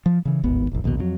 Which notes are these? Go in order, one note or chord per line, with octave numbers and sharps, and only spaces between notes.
F3
C#3 E3
D1 G#1 D#2 B3
F1 A#1
A#1 D#2 G#2 B2
F2 C3 F#3